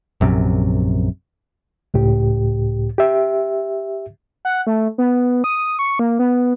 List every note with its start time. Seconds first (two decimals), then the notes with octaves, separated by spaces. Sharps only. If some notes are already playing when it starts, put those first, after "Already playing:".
0.21 A#1 F#2 C3
1.94 C#2 A2 G4
2.98 G4 E5
4.45 F#5
4.67 A3
4.98 B3
5.44 D#6
5.79 C#6
5.99 A#3
6.19 B3